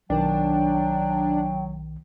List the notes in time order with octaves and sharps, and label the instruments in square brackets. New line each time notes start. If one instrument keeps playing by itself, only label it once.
[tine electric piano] B1 D#3 [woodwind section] F#3 [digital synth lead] D4 [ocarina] G5